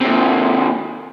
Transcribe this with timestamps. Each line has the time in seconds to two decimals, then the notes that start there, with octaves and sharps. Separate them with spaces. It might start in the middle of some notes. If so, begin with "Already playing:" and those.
0.01 D#2 C3